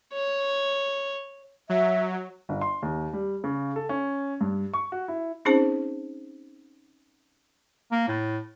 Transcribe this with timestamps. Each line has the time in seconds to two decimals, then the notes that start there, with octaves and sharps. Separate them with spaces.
0.13 C#5
1.69 F#3 E5
2.49 G1
2.61 C6
2.82 D#2
3.13 G3
3.44 C#3
3.76 A4
3.89 C#4
4.41 G2
4.74 C#6
4.92 F#4
5.08 E4
5.45 C4 C#4 D#4 G#4 C5 A5
7.92 A#3
8.08 A2